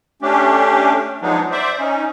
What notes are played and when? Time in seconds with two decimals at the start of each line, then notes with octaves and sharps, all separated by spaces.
0.22 A3 C#4 D4 G4
1.22 F3 F#3 G#3 B3 D4 D#4
1.51 C5 D5 E5
1.79 C#4 D#4